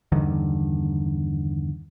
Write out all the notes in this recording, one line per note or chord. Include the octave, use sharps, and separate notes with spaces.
E2 G2 D3 D#3